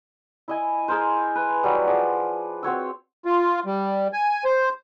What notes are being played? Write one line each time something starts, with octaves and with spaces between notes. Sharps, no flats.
E4 D#5 G#5
G#4 A#4 C5
B4
F#3 G3
F3 G#4 D5
C4 F#4 C#5 E6
F4
G3
G#5
C5